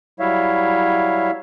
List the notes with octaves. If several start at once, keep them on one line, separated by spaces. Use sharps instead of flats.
F#3 G3 E4 C#5 E5 F5